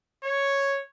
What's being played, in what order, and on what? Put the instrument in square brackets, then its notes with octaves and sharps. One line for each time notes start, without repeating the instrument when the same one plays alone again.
[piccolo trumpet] C#5